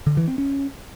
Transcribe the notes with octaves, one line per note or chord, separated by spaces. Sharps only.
D3
E3
C4
C#4